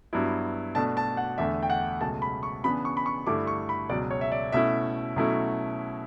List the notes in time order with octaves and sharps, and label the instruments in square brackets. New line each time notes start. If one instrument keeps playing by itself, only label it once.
[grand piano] G2 F#3 B3 E4
B2 A3 D4 A5
A5
F#5
E2 D3 A3 E5
G5
F#5
C#2 B2 F#3 A3 A5
B5
C#6
C#3 E3 B3 D4 B5
C#6
B5
C#6
G2 D3 A3 E4 D6
C#6
B5
C#2 B2 F#3 D5
C#5
E5
D5
B2 A3 C#4 E4 E5
B2 F#3 A3 C#4 E4